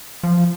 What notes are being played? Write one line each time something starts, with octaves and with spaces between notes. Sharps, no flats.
F3